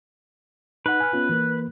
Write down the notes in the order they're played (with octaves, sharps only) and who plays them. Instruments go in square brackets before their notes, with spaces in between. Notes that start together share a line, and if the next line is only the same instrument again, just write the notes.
[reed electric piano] D#4 F#5 [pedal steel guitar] B4
[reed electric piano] G#5 F6
B3 C#4 F4
E3 A#3